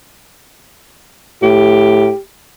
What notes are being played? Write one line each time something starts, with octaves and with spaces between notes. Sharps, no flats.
A2 G4